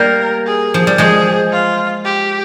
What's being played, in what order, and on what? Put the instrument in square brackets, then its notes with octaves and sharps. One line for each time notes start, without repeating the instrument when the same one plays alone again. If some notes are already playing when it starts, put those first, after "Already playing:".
Already playing: [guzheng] G3 A#3 [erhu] A#4
[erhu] G#4
[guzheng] F3
G3
[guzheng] F3 G#3 [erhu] G#4
[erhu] F4
G4